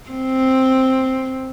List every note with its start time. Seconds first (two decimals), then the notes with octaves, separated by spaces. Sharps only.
0.10 C4